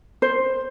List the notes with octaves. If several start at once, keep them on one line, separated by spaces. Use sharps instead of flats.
C5